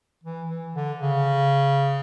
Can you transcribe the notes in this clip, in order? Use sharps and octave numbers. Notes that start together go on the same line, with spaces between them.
E3
E3
D3
C#3